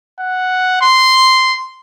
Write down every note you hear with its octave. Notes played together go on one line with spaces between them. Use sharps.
F#5
C6